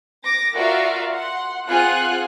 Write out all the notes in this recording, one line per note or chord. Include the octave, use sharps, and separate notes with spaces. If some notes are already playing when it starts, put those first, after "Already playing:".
D6 A#6
F4 F#4 A#4 D5 E5 F5
F#5 C6
C4 F4 G#4 F#5 G#5 F#6